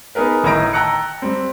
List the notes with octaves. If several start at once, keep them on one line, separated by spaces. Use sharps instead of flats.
B3 D#4 G#4 A#4 B4
G1 A2 D#3 D#5 A#5 D7
G5 A5 A#5 E6 F#6 C#7
G3 C4